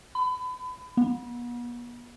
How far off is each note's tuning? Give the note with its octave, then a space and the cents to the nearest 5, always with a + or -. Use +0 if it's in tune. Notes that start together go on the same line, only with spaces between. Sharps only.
B5 +35
B3 -40